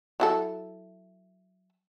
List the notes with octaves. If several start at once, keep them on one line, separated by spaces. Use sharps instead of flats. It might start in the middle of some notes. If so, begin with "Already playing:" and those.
F#3 E4 A4